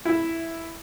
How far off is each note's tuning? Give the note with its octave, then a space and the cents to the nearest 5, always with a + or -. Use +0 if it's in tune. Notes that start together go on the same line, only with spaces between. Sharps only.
E4 +0 E5 +0